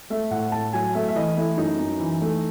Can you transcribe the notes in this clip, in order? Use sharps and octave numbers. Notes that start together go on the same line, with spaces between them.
A3 E5
A2 F#5
A2 A5
F#3 G#5
A3 E5
E5
E3 D#5
A3 E4
F#2 D#4
F#2
E3
A3